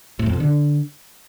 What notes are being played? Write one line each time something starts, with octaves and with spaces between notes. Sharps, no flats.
A2
F2
B2
D3